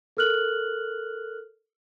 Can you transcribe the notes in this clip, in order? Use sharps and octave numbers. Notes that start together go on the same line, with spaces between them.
A4 A#4 F6 F#6 F#7